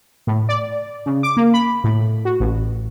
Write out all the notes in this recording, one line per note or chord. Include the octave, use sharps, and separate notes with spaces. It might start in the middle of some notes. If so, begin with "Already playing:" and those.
A2
D5
C#3
D6
A#3
B5
A2
F#4
A1